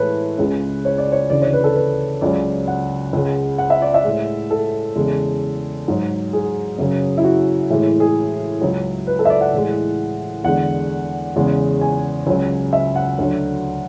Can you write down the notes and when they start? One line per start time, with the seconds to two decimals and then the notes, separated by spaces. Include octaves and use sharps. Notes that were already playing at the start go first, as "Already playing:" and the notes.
Already playing: A2 E3 G#3 A4 B4 C#5
0.38 C#2 C#3 G#3
0.85 C#5
0.98 D5
1.12 C#5
1.30 D2 C#3 E3 D5
1.42 C#5
1.53 B4
1.64 A4
1.76 B4
2.21 C#2 C#3 F#3 D5
2.68 F#5
3.13 C#2 C#3 G#3
3.58 F#5
3.70 E5
3.82 D5
3.94 E5
4.04 A2 G#3
4.50 A4
4.96 E2 C#3 G#3
5.88 G#2 F#3
6.33 G#4
6.78 F#2 C#3 F#3
7.17 E4
7.24 F#4
7.70 A2 E3 G#3 E4
8.00 G#4
8.61 C#2 C#3 F#3
9.07 B4
9.19 A4
9.25 E5
9.30 D5
9.41 F#5
9.53 A2 E3 G#3
10.44 E2 D3 G#3 F#5
11.36 E2 C#3 G#3
11.81 G#5
12.27 C#2 C#3 F#3
12.73 E5
12.96 F#5
13.19 D2 D3 F#3